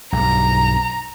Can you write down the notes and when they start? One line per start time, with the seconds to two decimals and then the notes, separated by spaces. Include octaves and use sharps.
0.13 B1 G2 A#5